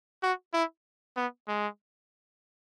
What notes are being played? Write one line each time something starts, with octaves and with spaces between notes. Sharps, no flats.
F#4
E4
B3
G#3